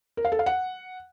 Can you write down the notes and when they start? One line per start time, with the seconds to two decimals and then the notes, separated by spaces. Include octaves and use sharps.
0.17 A#4
0.25 F5
0.32 A4
0.39 F5
0.46 F#5